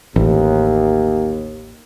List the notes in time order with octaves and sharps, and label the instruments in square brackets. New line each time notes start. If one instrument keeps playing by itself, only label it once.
[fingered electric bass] A1 [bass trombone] D#2